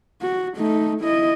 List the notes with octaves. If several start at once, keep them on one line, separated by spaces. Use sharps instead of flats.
F#4
A3 D#4
E4 D#5